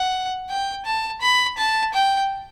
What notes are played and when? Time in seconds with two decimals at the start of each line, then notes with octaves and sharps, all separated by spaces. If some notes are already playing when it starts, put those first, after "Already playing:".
Already playing: F#5
0.49 G5
0.85 A5
1.21 B5
1.58 A5
1.94 G5